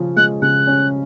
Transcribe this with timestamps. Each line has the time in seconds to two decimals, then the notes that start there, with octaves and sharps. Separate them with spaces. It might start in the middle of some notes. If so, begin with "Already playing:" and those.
Already playing: C#3 F3 C#4
0.16 G#3 F#6
0.42 C#3 F#6
0.67 C#4